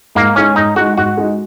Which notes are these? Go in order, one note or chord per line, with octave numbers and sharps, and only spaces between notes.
G#2 A#3
G#3 C#4 D#4
G#2 D#4
G#3 D#4 F#4
G#2 F#4
G#3 D#4